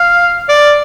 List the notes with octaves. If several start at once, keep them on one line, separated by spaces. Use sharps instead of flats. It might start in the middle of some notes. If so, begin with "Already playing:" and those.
Already playing: F5
D5